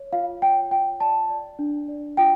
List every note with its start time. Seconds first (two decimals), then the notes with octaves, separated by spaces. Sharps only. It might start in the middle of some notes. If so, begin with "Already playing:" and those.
Already playing: C#5
0.13 F4 F5
0.42 C#5 G5
0.71 F4 G5
1.00 D5 A5
1.30 D5
1.59 D4
1.88 D5
2.17 F4 G5